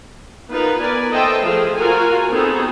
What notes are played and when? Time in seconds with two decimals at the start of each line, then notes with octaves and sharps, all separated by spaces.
0.50 B3 D#4 F4 A#4 B4
0.79 A#4 B4 D5 G#5
1.11 A4 C5 D#5 E5 G5 A5
1.44 F3 A3 G#4 C5 F5
1.75 F4 F#4 A#4 G#5
2.30 B3 C4 D#4 F#4 G#4 A4